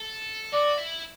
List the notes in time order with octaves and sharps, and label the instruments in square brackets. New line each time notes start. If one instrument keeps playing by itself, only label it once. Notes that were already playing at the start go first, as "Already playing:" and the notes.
Already playing: [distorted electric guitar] A4
[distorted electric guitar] F#4 [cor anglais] D5
[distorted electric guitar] E4